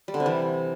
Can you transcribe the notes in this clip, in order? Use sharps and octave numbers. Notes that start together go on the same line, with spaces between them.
G3
D3
C3
E3